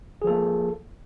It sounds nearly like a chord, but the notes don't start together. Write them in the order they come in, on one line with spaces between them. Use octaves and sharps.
G#4 F3 A4 A#3